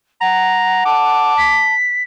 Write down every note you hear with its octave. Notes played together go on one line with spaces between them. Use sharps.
F#5 A#5
A5 D6
B6